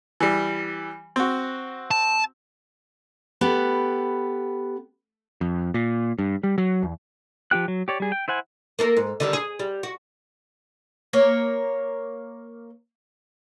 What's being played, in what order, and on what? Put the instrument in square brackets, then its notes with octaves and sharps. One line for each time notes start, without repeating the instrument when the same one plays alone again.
[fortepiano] E3 G3
C4 F#4
[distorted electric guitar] A5
[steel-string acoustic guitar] B3 G4 A4 B4
[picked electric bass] F2
A#2
G2
G3
F#3
E2
[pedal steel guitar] F3 F4 G4 G5 F#6
F#3
G4 C#5 D5
G3 G#4
G5
E4 C5 F#5 G#5
[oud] A#3 A4 A#4
G#2
D3 D#3 G3
G#4
G3
F#4
[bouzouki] A#3 A#4 C#5